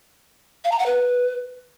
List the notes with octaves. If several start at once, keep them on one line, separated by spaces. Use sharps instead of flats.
F5
A#5
F#5
B4